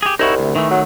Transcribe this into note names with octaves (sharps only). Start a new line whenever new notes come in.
G4 G#4
C2 D#4 E4 F#4
D2
D#3 E3 A3
F#3